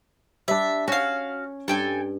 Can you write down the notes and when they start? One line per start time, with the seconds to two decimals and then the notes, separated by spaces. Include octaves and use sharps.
0.48 G3 D4 E5
0.88 C#4 F#4 F5
1.68 G2 A4 G5 G#5